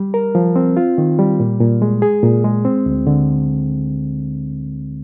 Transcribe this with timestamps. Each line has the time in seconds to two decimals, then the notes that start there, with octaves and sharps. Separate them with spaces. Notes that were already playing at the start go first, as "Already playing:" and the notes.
Already playing: G3
0.14 A#4
0.35 F3
0.56 C4
0.77 F4
0.98 D#3
1.18 G3
1.40 A#2
1.60 A#2
1.82 G#3
2.02 G#4
2.23 A#2
2.44 G#3
2.65 C4
2.86 D2
3.07 D3